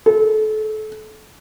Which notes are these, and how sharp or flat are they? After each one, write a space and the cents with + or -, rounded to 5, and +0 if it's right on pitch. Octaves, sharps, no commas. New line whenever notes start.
A4 -30